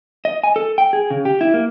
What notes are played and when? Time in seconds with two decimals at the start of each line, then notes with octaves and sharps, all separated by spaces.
0.25 D#5
0.44 G#5
0.56 A4
0.78 G5
0.93 G#4
1.11 C#3
1.25 G4
1.41 E4
1.54 A#3